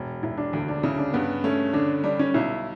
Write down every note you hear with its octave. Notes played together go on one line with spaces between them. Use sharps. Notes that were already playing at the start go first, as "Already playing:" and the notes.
Already playing: E1
E1 E4
D4
D2
D4
C#3 E4
D4
G2 B3
A3 C#4
D3 D4
G3 D4
C#4
B1 E4